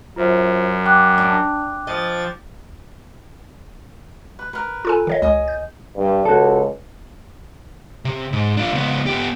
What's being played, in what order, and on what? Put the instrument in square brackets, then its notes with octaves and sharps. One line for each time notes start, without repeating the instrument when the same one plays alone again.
[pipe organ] F#2 [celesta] F4 C5 E5
[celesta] G5 D6 F#6
[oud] D4
[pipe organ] F3 A6 [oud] D#5
[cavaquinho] B4
A#4 B4
[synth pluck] F4 A4 G#5
D#3 C#5 D#5
[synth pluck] C#2 [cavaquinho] D#5 G#5 D#6
[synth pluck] G6
[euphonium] G2
[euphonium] C#2 [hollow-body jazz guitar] F#4 A4
[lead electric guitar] C3
G#2
D4 F4
C#2 B3
B3 G4